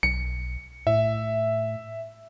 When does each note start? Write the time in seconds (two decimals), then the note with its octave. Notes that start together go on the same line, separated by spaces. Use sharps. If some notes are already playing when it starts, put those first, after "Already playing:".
0.03 B1 C#7
0.87 A2 E5